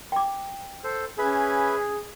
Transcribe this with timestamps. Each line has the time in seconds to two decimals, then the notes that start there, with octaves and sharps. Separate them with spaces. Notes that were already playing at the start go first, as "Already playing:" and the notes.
0.12 G5 D6
0.84 A4 C5
1.19 C#4 G#4 B4 E5 B5